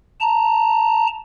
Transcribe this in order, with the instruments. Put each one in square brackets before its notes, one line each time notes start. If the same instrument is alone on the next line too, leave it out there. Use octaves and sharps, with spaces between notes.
[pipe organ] A5 A#5